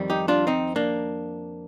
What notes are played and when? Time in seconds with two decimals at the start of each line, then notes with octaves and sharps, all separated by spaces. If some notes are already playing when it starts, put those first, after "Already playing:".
Already playing: F2 D#3 G3
0.10 D#4 G4
0.28 D4 F4
0.47 C4 D#4
0.76 A#3 D4